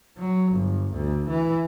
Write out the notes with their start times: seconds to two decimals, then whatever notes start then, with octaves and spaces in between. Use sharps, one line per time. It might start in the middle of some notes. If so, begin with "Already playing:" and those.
0.18 F#3
0.52 G1
0.94 D2
1.29 E3